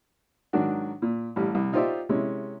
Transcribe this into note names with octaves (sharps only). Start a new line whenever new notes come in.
G#2 D#3 F#3 D4 F#4
A#2
A1 G3
C2
D#4 F4 G4 C5 D5 E5
C3 G#3 C#4 E4